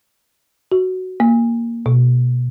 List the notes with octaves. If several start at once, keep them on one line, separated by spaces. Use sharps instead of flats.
F#4
A#3
B2